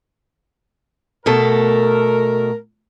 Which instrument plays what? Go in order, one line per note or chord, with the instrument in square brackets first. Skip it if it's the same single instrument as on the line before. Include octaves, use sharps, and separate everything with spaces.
[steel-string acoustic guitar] B2 A3 A4 [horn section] A#4